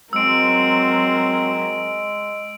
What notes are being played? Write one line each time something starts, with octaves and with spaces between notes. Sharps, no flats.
F#3 G#3 C4 A#4 E6 D7